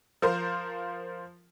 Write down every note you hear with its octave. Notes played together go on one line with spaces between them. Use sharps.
F3 A#4 C5